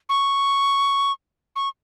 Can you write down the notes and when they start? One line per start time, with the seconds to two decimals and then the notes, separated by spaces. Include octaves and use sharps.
0.09 C#6
1.56 C#6